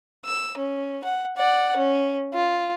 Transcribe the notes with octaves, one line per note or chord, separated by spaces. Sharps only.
E6
C#4
F#5
D5 F#5
C#4
F4